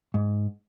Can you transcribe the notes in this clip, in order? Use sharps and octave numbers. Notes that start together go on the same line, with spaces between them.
G#2